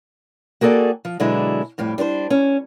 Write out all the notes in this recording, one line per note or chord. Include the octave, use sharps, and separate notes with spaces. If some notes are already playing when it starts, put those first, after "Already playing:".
A#3 F#4 G#4 A4 D5 G5
F3
B2 D3 F#3 G#3 D4 E4
F2 A2 G3 G4
G3 D4 A#4 C5
C#4